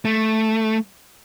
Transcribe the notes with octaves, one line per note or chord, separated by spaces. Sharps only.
A3